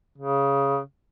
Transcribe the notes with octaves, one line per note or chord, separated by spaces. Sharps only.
C#3